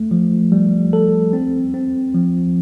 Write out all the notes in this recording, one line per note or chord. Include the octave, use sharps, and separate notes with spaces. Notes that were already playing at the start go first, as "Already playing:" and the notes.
Already playing: A3
F3
G3
A4
C4
C4
F3